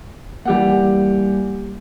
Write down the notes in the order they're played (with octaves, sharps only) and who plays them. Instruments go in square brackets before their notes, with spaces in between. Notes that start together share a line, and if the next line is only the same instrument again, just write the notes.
[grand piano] E3 G4 F#5 [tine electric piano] G3 A#3